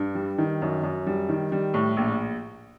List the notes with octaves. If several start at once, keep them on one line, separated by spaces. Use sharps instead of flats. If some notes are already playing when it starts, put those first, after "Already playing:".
Already playing: G2
G3
D#3
F#2
F#2
G3
D#3
G3
A2
A#1